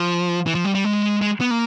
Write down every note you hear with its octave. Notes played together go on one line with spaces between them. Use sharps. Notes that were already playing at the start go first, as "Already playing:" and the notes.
Already playing: F3
E3
F3
G3
G3
G#3
G#3
B3
A#3